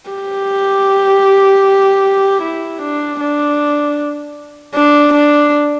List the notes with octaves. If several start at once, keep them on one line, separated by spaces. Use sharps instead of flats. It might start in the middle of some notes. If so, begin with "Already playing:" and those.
G4
E4
D4
D4
D4
D4